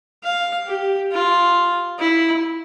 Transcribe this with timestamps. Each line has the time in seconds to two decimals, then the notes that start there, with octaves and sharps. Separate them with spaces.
0.23 F5
0.67 G4
1.12 F4
1.99 E4